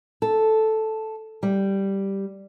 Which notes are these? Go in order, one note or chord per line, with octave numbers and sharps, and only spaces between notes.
A4
G3